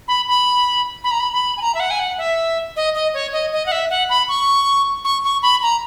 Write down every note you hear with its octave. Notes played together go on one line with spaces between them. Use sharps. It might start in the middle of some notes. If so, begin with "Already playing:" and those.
B5
B5
B5
A#5
B5
B5
G#5
A#5
E5
F#5
G#5
F#5
E5
D#5
D#5
C#5
D#5
D#5
F#5
E5
F#5
B5
C#6
C#6
C#6
B5
A#5